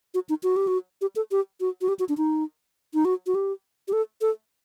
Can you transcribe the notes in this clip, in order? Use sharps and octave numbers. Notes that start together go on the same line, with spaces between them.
F#4
D#4
F#4
G4
F#4
G4
A4
G4
F#4
F#4
G4
F#4
D4
D#4
D#4
F#4
F#4
G4
G4
A4
A4